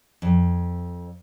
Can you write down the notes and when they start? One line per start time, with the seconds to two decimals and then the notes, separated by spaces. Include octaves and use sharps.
0.22 F2